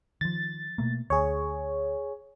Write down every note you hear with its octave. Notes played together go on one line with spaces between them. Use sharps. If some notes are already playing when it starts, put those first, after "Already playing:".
D#3 F3 A6
B2 A3 A#3
D2 G#4 C#5